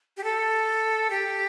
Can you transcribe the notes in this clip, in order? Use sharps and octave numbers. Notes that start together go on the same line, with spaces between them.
G4
A4
G4